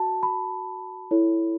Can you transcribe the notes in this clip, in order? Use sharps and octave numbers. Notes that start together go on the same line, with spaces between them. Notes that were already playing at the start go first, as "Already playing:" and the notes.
Already playing: F#4 A5
B5
E4 A4 C#5